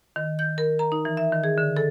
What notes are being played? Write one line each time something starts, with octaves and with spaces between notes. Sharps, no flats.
D#3
G6
A#4
A#5
D#4
E3
E5
D#3
G#4
D3
A4